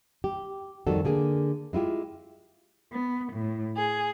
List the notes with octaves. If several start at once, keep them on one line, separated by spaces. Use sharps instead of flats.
G4
F2 D#3 G3 F#4 A4
D3 A#3 G#4
G#3 E4 F4 G4
B3
A2
G#4